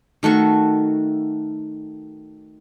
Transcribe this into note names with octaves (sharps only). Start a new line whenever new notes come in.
D#3 A3 F#4 C#6